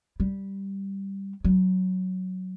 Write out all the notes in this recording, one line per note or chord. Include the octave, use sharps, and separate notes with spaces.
G3
F#3